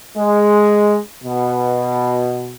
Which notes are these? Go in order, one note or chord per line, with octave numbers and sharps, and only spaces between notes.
G#3
B2